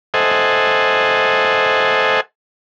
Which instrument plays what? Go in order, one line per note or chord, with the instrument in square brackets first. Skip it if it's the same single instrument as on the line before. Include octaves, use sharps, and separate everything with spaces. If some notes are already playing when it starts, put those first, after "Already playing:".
[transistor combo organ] A4 C5 D#5 E5 F#5 G#5